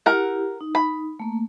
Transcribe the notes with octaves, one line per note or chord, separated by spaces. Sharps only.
E4 G4 A#4 F#5
D#4
B5
A3 A#3